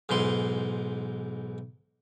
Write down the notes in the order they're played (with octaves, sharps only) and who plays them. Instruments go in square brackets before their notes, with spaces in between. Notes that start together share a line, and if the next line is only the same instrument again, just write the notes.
[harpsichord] B1 G#2 E3 C6